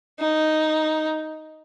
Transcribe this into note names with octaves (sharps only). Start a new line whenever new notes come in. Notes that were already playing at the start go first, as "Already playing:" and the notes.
D#4